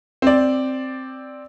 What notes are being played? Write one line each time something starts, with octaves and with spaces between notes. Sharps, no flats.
C4 D5